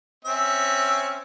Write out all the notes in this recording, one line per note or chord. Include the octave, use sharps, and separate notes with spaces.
C4 C#4 E5